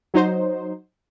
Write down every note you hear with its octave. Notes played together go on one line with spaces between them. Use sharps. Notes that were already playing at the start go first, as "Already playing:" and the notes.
F#3 D#4 C5